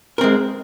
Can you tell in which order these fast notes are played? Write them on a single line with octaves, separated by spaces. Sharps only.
A#4 C4 G#3